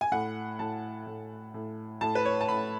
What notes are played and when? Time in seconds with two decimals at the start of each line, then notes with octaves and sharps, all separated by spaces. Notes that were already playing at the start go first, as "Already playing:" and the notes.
0.01 G#5
0.12 A2 F#5
0.59 A2 A5
1.07 A2
1.54 A2
2.01 A2 A5
2.15 B4
2.25 C#5
2.41 A5
2.49 A2 B5